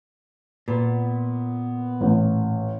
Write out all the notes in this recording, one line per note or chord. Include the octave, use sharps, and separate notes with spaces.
A#2 B3
A1